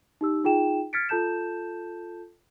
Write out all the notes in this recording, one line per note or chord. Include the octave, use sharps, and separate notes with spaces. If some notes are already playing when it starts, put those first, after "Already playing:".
D#4 G4 E6
D#4 F4 G#4 G5 E7
F6 G#6 A6 B6 C#7 D7
F4 A4 A5 G6 E7